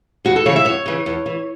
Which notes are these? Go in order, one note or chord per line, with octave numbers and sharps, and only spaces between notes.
E2 F#4
A4
C#3 E3 C#5
E5
F#2 C#5
C#3 E3
E2
E3